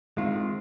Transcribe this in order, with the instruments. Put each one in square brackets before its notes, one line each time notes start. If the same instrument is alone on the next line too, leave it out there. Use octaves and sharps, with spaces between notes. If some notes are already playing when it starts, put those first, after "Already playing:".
[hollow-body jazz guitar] D#3 G#3 C4 F4